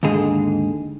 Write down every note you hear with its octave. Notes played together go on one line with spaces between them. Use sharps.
D#2 G#2 D3 G#4